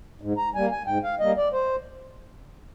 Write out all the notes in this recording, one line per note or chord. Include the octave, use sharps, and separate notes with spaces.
G#2
A#5
G3 A#3 G#5
G#5
G#2 G5
F5
G3 A#3 D#5
D5
C5